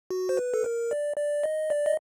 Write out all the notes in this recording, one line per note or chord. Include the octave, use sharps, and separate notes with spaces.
F#4
C5
B4
A4
A#4
D5
D5
D#5
D5
D#5